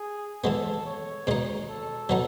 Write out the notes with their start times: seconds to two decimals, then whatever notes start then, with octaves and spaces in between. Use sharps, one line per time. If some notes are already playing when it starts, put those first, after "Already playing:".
Already playing: G#4
0.44 E3 G#3 B3 A4
0.86 C#5
1.27 B2 G#3 D#4
1.69 A4
2.09 F#3 B3 D#4